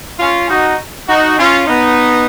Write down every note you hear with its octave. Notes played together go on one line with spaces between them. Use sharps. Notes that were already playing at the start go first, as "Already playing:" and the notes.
C#4 F4
D#4 F#4
D#4 F#4
C#4 F4
B3 D#4